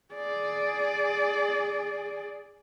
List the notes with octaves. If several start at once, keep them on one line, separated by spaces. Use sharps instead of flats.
G#4 D5